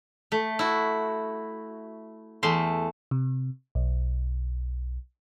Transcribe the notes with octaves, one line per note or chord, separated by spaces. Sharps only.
A3
E4 F#4
E2 A3 C6
C3
B1